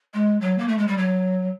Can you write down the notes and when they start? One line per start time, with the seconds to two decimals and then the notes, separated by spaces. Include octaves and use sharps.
0.14 G#3
0.41 F#3
0.58 A#3
0.68 A3
0.78 G#3
0.87 G3
0.98 F#3